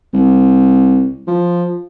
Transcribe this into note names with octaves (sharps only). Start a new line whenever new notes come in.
C2
F3